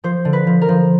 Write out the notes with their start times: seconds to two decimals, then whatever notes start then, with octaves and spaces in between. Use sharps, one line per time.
0.04 F3 C5
0.25 D3
0.33 B4
0.47 F3
0.62 A#4
0.69 F3